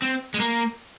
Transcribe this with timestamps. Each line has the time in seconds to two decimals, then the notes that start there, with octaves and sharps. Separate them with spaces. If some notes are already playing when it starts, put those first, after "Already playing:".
0.02 C4
0.34 G#3
0.40 A#3